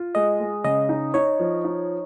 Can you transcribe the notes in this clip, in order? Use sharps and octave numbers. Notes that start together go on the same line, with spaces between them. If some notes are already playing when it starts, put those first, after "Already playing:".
Already playing: F4
G#3 D#5
G#3
C#3 D#5
D#4
D#4 C#5
F3
D#4